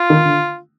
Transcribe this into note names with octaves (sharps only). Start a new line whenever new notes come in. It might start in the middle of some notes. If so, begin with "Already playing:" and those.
Already playing: F4
D#3
D3